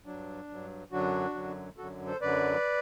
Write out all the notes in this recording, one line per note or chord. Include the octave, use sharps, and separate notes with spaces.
G2 F#3 D4
G2 F#3
F#2 D3 F#3 D4 F#4
F#2 D3 F#3
F#2 D3 F#3 F#4 A4
A4 C5
F#2 D3 F#3 B4 D5